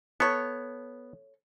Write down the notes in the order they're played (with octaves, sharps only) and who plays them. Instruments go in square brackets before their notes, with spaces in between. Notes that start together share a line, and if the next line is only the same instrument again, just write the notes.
[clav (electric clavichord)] B3 [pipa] A4 C#5